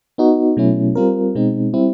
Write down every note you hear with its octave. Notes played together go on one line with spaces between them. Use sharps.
B3 D#4 F#4
B2 F#3 A3 C#4 E4
G3 C4 F4 A#4
B2 G#3 C4 D#4
G3 C4 E4